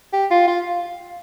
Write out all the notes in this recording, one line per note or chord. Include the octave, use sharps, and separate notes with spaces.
G4
F4
F4